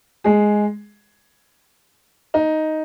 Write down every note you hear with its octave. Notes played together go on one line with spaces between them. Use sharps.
G#3 G#4
D#4